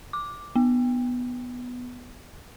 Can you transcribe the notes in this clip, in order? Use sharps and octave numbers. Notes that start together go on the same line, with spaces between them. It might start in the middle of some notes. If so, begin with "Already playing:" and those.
D6
B3